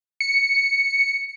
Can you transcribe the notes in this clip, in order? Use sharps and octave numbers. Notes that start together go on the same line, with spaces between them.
C#7